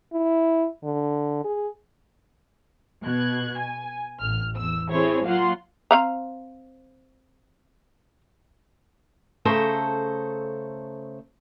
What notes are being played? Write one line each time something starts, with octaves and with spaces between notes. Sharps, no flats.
E4
D3
G#4
B2 F#6 G#6
G#5
A1 F6
E2 E6
C4 E4 G#4 A4 C5 C#5
F#3 A#3 F4 F5 F#5 C6
C4 F5 A#5
C#3 A3 A4 C5 A#5